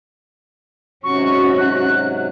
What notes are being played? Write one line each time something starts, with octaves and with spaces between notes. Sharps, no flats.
G#2 C3 F#3 C#4 F#4 C#6
F#6